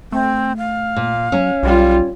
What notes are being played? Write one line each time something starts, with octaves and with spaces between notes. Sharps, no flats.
A3 C4
F5
A#2
F#3 C#4
B1 G3 F4